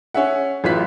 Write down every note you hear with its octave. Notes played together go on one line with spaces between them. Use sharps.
C#4 G#4 E5 F#5
A1 F#3 F4 F#6 B6